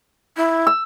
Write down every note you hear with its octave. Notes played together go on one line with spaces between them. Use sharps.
E4
E6